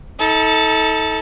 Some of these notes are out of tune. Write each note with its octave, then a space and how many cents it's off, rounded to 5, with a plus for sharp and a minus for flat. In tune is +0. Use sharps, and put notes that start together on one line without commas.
D#4 +40 A4 +0